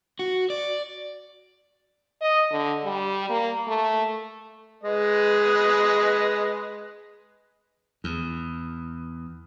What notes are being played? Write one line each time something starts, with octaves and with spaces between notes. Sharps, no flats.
F#4
D5
D#5
D3
G3
A#3
A3
G#3 B4 D#5
E2